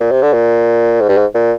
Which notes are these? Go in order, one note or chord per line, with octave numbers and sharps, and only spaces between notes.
A#2
C3
D3
A#2
G#2
G2
G#2
A#2